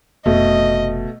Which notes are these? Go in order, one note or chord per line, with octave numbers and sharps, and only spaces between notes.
F1 B2 A3 D#5